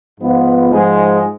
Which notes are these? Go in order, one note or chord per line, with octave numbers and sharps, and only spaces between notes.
G#2 F3 B3 F4 B4
G#2 F3 G#3 D#4 G#4